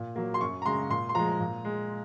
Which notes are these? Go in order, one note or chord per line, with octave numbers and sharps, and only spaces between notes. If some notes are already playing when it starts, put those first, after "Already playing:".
Already playing: A#2
F#3 A#3
C6
F#2 C#6
A#5
C#3 G#3 C6
A#2 C6
C6
F3 G#3 A#5
A#2
G#3